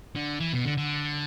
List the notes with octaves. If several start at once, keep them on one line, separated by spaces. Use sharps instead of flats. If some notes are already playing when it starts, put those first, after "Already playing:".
D3
E3
B2
D3
D3